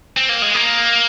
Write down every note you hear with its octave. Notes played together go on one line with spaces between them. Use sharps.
C4
A#3
G#3
A#3